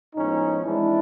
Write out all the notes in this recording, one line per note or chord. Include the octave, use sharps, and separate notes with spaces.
A2 F3 G#3 B3 C#4 D#4
E3 G#3 C4 D4 E4